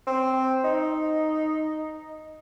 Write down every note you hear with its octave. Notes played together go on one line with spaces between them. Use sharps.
C4
D#4